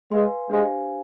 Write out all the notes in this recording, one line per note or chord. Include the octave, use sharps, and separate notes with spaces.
G#3 B4 F5 G#5 C6
G#3 D4 G4 C5 F5 G#5